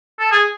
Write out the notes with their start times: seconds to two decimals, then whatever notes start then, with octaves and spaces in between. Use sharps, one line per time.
0.19 A4
0.32 G#4